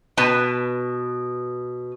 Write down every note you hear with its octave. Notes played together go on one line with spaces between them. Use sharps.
B2 B4 A5